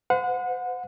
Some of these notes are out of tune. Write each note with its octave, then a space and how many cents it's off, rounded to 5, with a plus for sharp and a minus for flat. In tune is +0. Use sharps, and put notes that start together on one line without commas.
C5 -45 F#5 -30